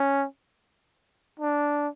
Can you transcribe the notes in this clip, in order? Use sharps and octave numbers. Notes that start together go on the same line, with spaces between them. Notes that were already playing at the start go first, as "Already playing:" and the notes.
Already playing: C#4
D4